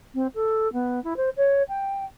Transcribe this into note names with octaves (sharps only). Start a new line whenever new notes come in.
C4
A4
B3
E4
C5
C#5
G5